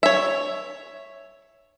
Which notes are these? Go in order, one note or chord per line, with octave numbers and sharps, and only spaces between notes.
C#5 E5